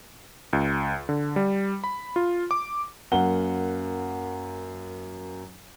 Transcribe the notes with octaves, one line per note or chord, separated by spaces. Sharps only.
C#2
D3
G3
B5
F4
D6
F#2 A#3 F#5 G7